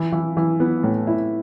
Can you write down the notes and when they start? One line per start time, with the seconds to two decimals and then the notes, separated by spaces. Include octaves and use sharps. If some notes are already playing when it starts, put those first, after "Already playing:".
Already playing: E3
0.12 E3
0.37 E3
0.60 B3
0.83 A2
1.07 E4